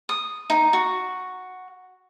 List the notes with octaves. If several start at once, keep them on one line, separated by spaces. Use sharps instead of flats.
D#6
D#4
F#4